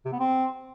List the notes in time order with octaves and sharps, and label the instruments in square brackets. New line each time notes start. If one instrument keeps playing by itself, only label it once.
[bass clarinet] C3
B3
C4